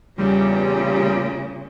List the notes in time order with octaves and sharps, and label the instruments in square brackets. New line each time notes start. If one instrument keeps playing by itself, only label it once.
[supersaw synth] E2 G3 [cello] A#2 C#3